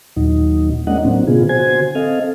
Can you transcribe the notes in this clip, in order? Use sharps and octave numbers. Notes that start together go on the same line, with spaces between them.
D#2 A#2 F#3 D#4
G#3 A#3 C#4 D4 D#5 F#5
A2 F#3 A#3 C4 D4
B2 D3 B3 F4 G#4
D3 F#4 C5 G#5 G#6
C4 A4 D#5 F5